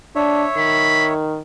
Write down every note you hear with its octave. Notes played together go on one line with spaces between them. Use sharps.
D4 C#5 E5
D#3 B5